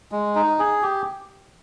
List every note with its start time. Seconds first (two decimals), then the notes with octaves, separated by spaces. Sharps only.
0.12 G#3
0.35 D#4
0.59 G#4
0.83 G4